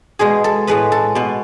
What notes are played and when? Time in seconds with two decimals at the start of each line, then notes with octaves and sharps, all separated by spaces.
0.19 B2 G#3 B3 G#4
0.44 A4
0.67 A2 G#3 B3 B4
0.92 A4
1.15 B2 B3